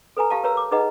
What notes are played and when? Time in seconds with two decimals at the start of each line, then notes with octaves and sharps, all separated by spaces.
0.17 A4 B4 G#5 A#5
0.30 G4 F5 A5
0.44 A#4 B4 C#5 A#5 E6
0.57 D6
0.71 D#4 G#4 B4 D#5 F#5 A#5